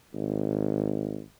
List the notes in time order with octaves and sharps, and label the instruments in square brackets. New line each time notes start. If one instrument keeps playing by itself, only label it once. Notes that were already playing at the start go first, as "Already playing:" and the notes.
[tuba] G#1